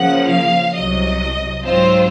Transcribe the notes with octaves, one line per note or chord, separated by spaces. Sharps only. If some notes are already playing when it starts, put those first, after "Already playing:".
Already playing: C#3 F3 A#3 F#5
F5
C2 C3 F#3 D#5
G#2 F#3 C4 F4 C5